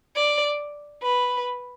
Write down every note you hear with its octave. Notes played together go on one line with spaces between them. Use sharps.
D5
B4